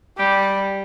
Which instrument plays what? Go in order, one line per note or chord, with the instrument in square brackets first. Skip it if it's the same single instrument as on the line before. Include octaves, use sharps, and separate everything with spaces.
[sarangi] G3 [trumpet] G4